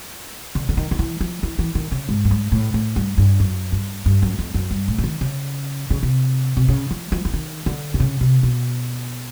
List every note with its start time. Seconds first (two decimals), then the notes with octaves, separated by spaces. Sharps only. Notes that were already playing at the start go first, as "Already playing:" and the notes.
0.55 D3
0.69 D3
0.77 D#3
0.91 D#3
0.99 E3
1.21 F3
1.43 E3
1.59 E3
1.75 D#3
1.92 C#3
2.09 G#2
2.25 G2
2.31 G#2
2.52 A2
2.74 A2
2.96 G2
3.18 G2
3.40 F#2
3.72 G2
4.06 G2
4.22 F#2
4.39 F2
4.54 F#2
4.71 G2
4.88 A2
4.98 D3
5.04 D#3
5.21 C#3
5.91 C#3
6.03 C3
6.57 C3
6.69 C#3
6.91 F3
7.12 F3
7.25 E3
7.34 D#3
7.66 D3
7.94 C3
8.00 C#3
8.21 C3
8.43 B2